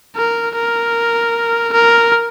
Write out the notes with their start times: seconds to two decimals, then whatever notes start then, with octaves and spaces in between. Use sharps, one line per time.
0.16 A#4
0.55 A#4
1.73 A#4